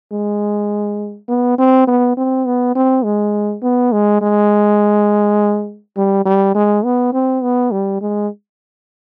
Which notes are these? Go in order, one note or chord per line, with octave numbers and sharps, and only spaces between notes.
G#3
B3
C4
B3
C4
B3
C4
G#3
B3
G#3
G#3
G3
G3
G#3
B3
C4
B3
G3
G#3